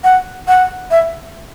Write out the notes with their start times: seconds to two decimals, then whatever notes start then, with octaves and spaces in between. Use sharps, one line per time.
0.04 F#5
0.48 F#5
0.91 E5